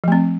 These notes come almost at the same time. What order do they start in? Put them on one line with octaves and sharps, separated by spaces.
F3 A3 C4